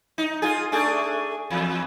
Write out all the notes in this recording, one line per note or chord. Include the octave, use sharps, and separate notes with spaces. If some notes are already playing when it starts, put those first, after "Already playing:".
D#4
F4 G#4
A3 D4 G#4
E2